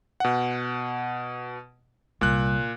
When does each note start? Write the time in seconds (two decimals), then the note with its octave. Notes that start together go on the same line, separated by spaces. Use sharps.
0.20 B2 F#5
2.21 C2 A#2 G3 F#6